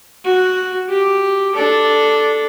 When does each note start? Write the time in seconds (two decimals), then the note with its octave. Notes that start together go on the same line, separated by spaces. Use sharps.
0.25 F#4
0.89 G4
1.55 D4 A4